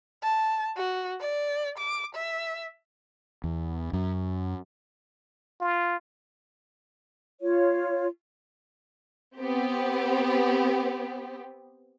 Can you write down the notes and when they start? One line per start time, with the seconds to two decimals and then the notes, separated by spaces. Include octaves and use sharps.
0.23 A5
0.76 F#4
1.21 D5
1.78 D6
2.15 E5
3.44 E2
3.93 F#2
5.60 F4
7.41 F4 C#5
9.37 B3 C4 G4